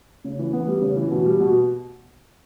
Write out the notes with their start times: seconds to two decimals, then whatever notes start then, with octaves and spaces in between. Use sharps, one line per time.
0.24 C#3
0.39 E3
0.53 B3
0.67 G3
0.81 C#3
0.96 E3
1.11 B2
1.26 G3
1.40 B2